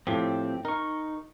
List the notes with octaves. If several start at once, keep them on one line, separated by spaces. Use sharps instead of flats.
A2 F3 C4 G4
D#4 A#4 C#6